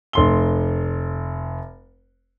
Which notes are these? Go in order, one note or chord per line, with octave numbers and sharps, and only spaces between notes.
F1 C6 G7